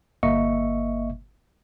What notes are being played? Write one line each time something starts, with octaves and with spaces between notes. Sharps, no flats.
G1 A#3 D#5 E5 C#6 C#7